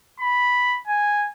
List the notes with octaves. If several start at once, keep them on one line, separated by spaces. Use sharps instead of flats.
B5
G#5